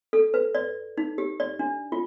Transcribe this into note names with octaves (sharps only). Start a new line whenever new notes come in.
A4
B4
D5
D#4
G4
D5
D4
F4